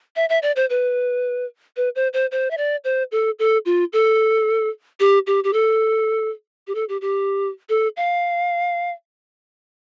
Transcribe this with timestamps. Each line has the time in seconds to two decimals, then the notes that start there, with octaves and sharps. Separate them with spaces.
0.16 E5
0.29 E5
0.42 D5
0.56 C5
0.70 B4
1.76 B4
1.95 C5
2.13 C5
2.31 C5
2.50 E5
2.57 D5
2.84 C5
3.12 A4
3.39 A4
3.65 F4
3.93 A4
5.00 G4
5.27 G4
5.44 G4
5.53 A4
6.67 G4
6.75 A4
6.89 G4
7.01 G4
7.69 A4
7.97 F5